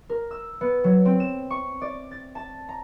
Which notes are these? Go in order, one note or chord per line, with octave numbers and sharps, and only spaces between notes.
A#4
E6
B3
F#3
C4
E7
C#6
D5
A6
A5
A#5